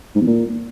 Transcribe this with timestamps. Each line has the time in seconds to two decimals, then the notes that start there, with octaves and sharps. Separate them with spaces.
0.15 G#2
0.21 E2
0.27 A#2